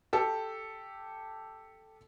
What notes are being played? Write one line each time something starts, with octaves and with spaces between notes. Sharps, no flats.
G4 A4